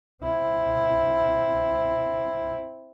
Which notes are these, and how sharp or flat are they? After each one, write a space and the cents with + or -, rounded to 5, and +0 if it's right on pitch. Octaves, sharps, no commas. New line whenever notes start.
C4 +0 E4 +0